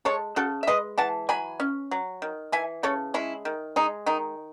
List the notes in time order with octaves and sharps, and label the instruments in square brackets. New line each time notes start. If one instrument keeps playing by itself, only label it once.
[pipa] G#3 A4 C#5
C#3 F#4 A4
E5
G#3 B4 D#5
E3 F#5 A5
F#3 G#5 B5
C#4
F#3
D#3
E3 E5 G#5
C#3 A4 C#5
G#3 C#4 E4
D#3
G#3 D#4
D#3 D#4